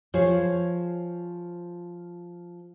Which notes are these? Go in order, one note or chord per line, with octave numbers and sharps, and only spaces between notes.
F3 G#4 C5 C#5